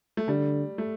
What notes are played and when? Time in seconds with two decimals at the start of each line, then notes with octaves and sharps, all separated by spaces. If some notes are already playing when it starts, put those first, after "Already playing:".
0.17 A3
0.28 D3 G3
0.78 A3